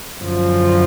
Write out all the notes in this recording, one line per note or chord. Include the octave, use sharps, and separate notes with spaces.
F#2 D3 F3